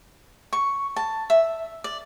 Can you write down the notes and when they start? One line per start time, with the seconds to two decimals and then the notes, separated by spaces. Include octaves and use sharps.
0.53 C#6
0.96 A5
1.30 E5
1.84 D5